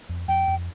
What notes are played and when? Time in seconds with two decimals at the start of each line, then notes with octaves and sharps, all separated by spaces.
0.09 F2
0.28 F2 G5
0.48 F2